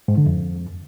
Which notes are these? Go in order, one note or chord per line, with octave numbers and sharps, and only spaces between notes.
G#2
D3
F2